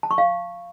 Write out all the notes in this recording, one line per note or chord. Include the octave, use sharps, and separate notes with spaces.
A5
C#6
F5